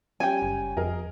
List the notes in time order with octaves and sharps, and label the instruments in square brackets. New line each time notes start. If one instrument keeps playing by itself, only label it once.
[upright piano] G3 C#4 [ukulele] G5 G#5
[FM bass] F#1
[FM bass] F2 [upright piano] G#4 A#4 D#5